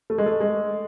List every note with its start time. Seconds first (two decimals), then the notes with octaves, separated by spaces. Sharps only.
0.10 A3
0.18 G#3
0.26 A3
0.41 G#3